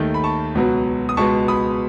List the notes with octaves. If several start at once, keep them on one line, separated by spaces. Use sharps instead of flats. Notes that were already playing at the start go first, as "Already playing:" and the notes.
Already playing: D#2 D#3 A3
B5
A5 C#6
C#2 B2 F#3 B3
D#6
C#2 B2 G#3 B3 A5 C#6
B5 D#6